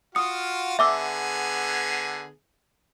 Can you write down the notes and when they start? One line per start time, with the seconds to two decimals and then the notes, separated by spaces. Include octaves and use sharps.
0.15 F4 F#4 F5 D#6 C#7
0.79 D3 B3 G#4 E5 D6 E6